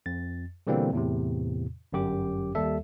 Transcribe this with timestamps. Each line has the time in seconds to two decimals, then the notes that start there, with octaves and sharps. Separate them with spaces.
0.06 F2 A6
0.67 B2 D3 E3 G3 A#3 C4
0.93 E2 A2 C3
1.93 G1 F#2 G4 D6
2.55 D#2 G3 A4 E5